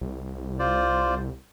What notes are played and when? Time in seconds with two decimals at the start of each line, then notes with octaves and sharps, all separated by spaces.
0.01 C2
0.59 F4 C5 D5